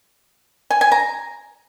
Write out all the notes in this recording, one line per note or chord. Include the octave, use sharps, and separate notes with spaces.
G#5
G#5
A#5